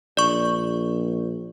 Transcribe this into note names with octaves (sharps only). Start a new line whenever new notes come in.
A#1 D5 C#6